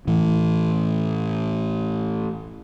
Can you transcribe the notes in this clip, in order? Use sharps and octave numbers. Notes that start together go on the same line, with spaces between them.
A2 E3